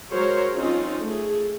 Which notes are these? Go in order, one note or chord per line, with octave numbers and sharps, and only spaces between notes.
F#3 G#3 A#4 C5 C#5
C4 C#4 D#4 F4
A3 G#4